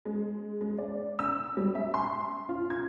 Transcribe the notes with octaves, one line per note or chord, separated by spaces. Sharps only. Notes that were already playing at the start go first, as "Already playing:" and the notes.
G#3
G#3
D5
E6
G3
E5
C6
F4
G#6